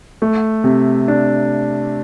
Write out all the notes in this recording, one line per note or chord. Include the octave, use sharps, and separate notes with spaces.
A3
C3
D4